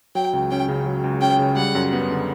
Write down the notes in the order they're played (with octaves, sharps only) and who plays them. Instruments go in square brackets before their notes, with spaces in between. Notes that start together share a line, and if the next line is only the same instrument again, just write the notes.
[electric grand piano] F#3 [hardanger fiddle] G5
[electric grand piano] C#2
[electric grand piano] C#4 [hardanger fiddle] G5
[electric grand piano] C#3
F#3
C#2
[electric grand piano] C#4 [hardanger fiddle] G5
[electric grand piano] C#3
[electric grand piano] G3 [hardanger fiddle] F#5
[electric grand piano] F#2
B3
D3